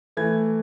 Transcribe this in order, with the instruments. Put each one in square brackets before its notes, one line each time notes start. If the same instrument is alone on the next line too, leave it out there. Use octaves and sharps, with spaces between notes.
[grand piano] E3 A3 E4 G#6